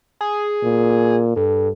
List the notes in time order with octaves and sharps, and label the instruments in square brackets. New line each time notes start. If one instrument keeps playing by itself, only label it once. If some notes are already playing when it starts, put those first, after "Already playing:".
[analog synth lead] G#4
[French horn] A#2
[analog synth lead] G2 [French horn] A4